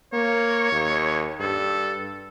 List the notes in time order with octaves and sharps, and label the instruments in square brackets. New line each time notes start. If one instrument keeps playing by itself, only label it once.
[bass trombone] A#3 [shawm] C#5
[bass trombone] D#2
[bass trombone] G2 [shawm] A4